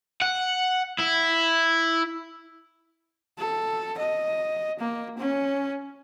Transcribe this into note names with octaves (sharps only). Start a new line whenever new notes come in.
F#5
E4
A4
D#5
A#3
C#4